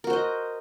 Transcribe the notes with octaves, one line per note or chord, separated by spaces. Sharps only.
F#4 A#4 C5 D#5